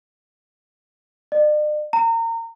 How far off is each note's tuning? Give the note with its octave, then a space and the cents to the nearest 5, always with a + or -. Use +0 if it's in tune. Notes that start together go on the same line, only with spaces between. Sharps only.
D5 +45
A#5 -30